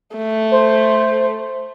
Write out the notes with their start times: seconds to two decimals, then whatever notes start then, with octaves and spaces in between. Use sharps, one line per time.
0.16 A3
0.51 C5